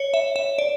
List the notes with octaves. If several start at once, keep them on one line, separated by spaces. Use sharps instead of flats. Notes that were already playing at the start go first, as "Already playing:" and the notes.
Already playing: C#5
E5
E5
D5